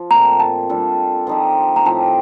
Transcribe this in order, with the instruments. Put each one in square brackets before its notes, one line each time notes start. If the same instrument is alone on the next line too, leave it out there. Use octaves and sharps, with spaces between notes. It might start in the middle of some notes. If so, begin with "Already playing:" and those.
Already playing: [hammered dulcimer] F3
[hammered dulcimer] A#2 A3 C4 [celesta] A#5
[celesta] A5
[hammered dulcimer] G3 D4 F4 A4
F3 C4 D#4 G4
[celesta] A#5
[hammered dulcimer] A2 F3 C4 G4 [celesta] A5